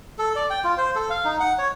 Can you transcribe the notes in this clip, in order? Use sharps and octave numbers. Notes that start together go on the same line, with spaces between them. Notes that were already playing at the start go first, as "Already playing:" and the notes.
A4
D5
G5
F4
C5
A4
F5
D#4
F#5
C#5